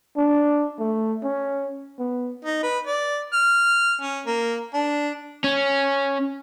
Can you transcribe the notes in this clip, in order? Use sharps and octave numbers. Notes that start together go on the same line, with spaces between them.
D4
A3
C#4
B3
D#4
B4
D5
F6
C#4
A#3
D4
C#4